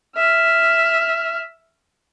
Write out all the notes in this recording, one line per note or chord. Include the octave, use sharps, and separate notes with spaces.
E5 F6